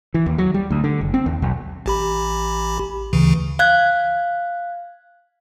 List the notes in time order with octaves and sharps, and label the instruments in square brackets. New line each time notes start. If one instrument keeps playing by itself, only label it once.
[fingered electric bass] E3
D#2
F#3
G3
D2
D3
F#1
C4
D#2
B1
[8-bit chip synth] A1 G4 B5
D2 C#3 E3
[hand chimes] F5 F#6 G#6